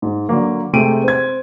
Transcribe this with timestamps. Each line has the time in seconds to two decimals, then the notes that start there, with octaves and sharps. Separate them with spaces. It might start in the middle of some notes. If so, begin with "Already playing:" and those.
0.02 G#2
0.29 D3 F#3 A#3
0.73 C3 G#3 A3 G5 D7 D#7
1.04 C4 G#6